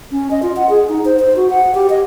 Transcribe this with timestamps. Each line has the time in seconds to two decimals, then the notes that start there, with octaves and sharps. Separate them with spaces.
0.11 C#4
0.31 D#5
0.43 F4
0.57 F#5
0.70 G#4
0.89 D#4
1.05 C5
1.19 C5
1.36 F#4
1.50 F#5
1.75 G4
1.90 D#5